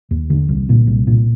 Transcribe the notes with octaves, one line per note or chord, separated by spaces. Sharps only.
D#2
D3
C2
A#2
C2
A#2